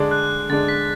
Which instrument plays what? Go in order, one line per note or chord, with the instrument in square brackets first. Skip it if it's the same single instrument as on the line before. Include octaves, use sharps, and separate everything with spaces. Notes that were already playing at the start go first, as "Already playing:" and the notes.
Already playing: [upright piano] D3 G#3 D4
[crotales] F#6
[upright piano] D3 G#3 D4 [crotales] A6
[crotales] B6